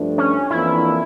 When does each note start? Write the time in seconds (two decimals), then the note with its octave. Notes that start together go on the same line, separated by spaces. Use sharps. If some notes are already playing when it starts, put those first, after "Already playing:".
Already playing: G2 F3 A3 D4
0.18 C#4
0.51 F2 E3 A#3 D4 E4